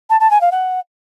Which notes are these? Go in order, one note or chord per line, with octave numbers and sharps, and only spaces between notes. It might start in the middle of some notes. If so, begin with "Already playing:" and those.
A5
A5
G#5
F5
F#5